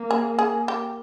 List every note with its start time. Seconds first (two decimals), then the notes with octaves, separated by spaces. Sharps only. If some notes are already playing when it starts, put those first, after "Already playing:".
Already playing: A#3
0.11 G#4
0.39 G#4
0.68 G4